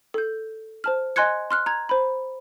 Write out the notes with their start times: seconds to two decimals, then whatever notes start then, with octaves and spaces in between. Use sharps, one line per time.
0.14 A4 G6
0.84 C5 A5 F6
1.16 D#5 G#5 C6 F#6 G#6 C#7
1.51 C6 F6 F#6
1.66 A#5 G#6
1.89 C5 B5